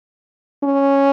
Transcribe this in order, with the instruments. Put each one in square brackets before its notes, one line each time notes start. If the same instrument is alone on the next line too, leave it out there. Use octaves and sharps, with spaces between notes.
[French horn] C#4